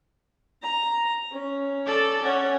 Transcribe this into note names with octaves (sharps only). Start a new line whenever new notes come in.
A#5
C#4
A4 D5
C#4 C#5 F#5